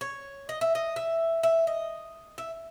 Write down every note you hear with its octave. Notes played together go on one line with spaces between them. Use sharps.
C#5
D#5
E5
D#5
E5
E5
D#5
E5